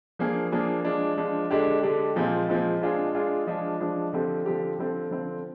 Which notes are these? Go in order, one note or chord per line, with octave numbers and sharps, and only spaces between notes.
F3 A#3 D4 G#4
F3 A#3 D4 G#4
F3 G#3 D4
F3 G#3 D4
D3 G#3 D4 G4
D3 G#3 D4 G4
A#2 F3 G#3 C4
A#2 F3 G#3 C4
G#3 D4 F4 G#4
G#3 D4 F4 G#4
F3 G#3 D4
F3 G#3 D4
D3 F3 C4 G4
D3 F3 C4 G4
D3 F3 C4
D3 F3 C4